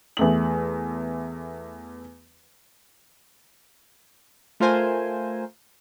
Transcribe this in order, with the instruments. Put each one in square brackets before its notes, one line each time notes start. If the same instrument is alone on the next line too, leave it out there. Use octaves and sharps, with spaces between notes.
[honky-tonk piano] E2 A3 F#7
[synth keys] A3 F4 A#4 C5 G#5